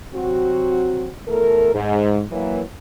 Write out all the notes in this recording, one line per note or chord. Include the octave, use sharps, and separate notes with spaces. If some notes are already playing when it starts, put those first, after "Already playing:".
C3 F#3 C4 F#4
E2 A3 A4 A#4
G#2
E3 F#3 A#3